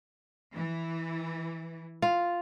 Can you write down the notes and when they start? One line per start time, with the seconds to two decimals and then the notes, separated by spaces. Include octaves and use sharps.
0.53 E3
2.02 F4